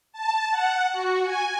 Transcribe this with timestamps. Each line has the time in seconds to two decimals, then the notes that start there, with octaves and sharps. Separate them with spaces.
0.12 A5
0.51 F#5
0.93 F#4
1.24 G#5